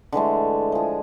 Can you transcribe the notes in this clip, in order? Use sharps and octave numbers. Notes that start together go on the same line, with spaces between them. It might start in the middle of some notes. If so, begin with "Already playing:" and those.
D3 E3 G#3 A3
F3 G#4